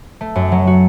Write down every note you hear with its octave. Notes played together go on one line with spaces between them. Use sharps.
A3
F#2
F#3
F#4